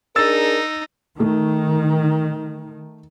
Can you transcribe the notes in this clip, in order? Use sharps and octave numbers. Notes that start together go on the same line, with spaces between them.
D4 D#4 G#4 A#4 E6 A6
D#3 A3